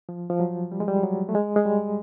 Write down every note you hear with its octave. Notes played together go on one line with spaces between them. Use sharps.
F3
F3
F#3
G3
G#3
G3
F#3
A3
G#3
G#3
G3